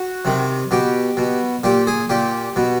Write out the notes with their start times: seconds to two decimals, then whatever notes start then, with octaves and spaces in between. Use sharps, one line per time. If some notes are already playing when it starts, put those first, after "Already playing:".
Already playing: F#4
0.25 C3 D#3
0.71 B2 G4
1.17 B2
1.64 A#2 G4
1.87 G#4
2.09 A#2 G4
2.56 B2